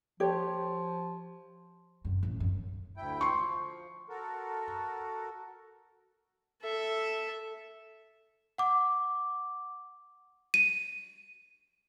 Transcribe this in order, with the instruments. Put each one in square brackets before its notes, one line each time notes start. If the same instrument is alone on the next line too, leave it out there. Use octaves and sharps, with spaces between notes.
[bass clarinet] F3 [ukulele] G4 C#5
[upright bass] F#2 C3
A1 D#2
G#1 F#2
F#2
[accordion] D2 E4 G5
[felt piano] C6 C#6
[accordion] F3
F#4 A4 A#4
[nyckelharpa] A4 E5
[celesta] F#5 D6
[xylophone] D#7